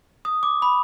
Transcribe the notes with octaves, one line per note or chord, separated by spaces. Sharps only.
D#6
D6
B5